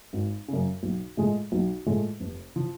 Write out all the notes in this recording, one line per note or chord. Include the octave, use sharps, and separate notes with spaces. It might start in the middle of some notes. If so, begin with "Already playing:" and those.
G#1
F#2 C#3
B1
A2 F3 G#3
B1
A2 F3 G#3
F1
F3